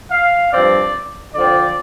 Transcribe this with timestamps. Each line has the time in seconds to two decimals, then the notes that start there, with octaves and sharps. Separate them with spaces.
0.11 F5
0.52 G2 F3 C4 D5
1.34 D3 F3 C4 D5